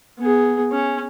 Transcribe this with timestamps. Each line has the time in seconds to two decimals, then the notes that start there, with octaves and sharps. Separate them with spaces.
0.18 B3 G#4
0.71 C#4